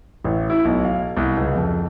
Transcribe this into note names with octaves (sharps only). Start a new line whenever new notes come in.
A1
E4
B1
F5
C2
C#2
F2